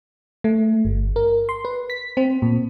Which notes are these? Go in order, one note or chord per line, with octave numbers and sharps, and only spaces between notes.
A3
G1
A#4
C6
B4
B6
C4
A#2